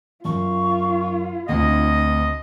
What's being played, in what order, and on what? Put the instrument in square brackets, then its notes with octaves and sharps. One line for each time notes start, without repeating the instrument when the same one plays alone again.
[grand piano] F#2 [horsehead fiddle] F4 [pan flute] C#6
[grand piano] D2 C4 [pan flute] D4 [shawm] D#5